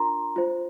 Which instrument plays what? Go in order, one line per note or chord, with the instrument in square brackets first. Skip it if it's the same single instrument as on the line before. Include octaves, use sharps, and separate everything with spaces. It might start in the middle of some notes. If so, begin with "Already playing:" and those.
Already playing: [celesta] D4 F4 A#4 A#5 C6
F4 C5